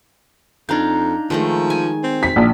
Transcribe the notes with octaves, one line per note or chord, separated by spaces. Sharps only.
F2 D4 D#4 F5 A#5 G6
D#3 F3 G#3 A3
G#5
C4
B6
A#1